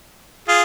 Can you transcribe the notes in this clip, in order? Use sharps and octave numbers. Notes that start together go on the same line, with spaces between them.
F4 G#4